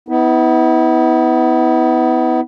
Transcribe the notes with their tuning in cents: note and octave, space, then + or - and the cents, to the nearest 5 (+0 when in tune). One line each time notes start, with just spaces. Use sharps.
B3 +20 E4 -30